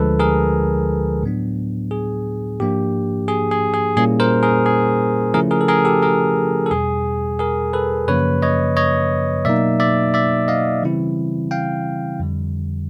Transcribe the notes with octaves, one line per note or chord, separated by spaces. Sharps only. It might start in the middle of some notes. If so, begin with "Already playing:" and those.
Already playing: D2 D3 F3 G#3 A4 B4
G#4 A#4
A2 F#3 B3 D4
G#4
G#2 F3 A#3 D4 G4
G#4
G#4
G#4
A#2 G3 A#3 C#4 E4 G#4
A#4 C5
G#4 A#4
G#4
C#3 F3 A3 C#4 E4 G#4 A#4
G#4 A#4
A4
G#4 A#4
G4 A4
G#4 A#4
A4
E2 B2 G3 G#4
G#4 A#4
A4 B4
F#2 C#3 F3 A#3 B4 C#5
C#5 D#5
C#5 D#5
B2 F#3 A#3 D#4 D5 E5
D5 E5
D5 E5
D#5 F5
C#3 E3 G3 C4 E4
F5 G5
F2 D3 G3